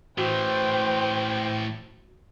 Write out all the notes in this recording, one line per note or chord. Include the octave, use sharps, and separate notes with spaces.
A2 E3 F#4 C5 G5